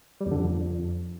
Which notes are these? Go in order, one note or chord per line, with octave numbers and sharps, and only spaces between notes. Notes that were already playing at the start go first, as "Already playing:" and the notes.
G3
E2
D3
F2